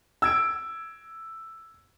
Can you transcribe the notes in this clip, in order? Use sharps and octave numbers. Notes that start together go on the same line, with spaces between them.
E6 G#6 D7